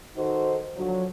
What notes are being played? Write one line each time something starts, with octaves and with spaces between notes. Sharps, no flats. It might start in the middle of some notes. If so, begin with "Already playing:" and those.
D#3 D#4 F#4 A4 C5
D3 F3 F#3